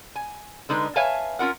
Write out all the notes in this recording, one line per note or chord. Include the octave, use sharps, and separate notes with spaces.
G#5
D3 G#3 D#4 B4
B4 C#5 E5 F5 G#5 A5
C#4 F4 A#4 F#5